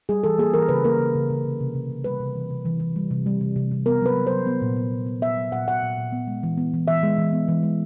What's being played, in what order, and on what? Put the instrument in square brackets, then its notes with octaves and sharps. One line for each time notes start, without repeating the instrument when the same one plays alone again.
[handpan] G3 G#4
E3 A4
A#3 G#4
E3 A#4
C#3 B4
A#3 A#4
C#3
C#3
C#3
C3
C3
C3
C3
G3 B4
C3
E3
C3
E3
E3
G3
C3
G3
C3
C3
C3
B3 A#4
F#3 B4
F#3
C5
F#3
B3
A#2
B3
A#2
B3
B3 E5
F#3
A#2 F#5
A#2 F#5
A#2
A#2
B3
G#3
E3
B3
E3
E3 E5
G#3
E3
B3
E3
G#3